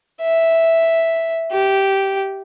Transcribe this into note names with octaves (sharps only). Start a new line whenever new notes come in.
E5
G4